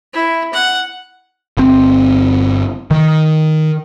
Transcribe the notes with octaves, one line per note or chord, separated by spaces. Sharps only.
E4
F#5
G1 C4
D#3